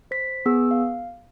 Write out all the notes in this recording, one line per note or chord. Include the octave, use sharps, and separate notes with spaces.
C5 B6
B3 G#4 E6
F5